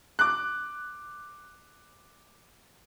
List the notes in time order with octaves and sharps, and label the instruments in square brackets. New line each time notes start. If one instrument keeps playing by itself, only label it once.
[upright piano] D6 F#6